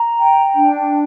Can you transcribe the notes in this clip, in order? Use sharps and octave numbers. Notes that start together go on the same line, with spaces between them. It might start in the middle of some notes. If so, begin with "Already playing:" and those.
Already playing: A#5
G5
D4